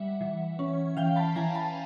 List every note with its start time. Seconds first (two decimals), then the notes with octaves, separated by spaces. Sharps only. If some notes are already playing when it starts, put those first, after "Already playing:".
Already playing: G3 E5 F#5
0.21 E3
0.59 C#4
0.97 E3 F5 G5
1.16 A5 B5
1.36 E3 G#5 A#5
1.55 A5 B5